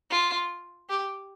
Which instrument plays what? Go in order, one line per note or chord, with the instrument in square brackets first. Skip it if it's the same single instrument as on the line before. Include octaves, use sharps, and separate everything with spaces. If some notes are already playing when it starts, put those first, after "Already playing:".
[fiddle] F4
G4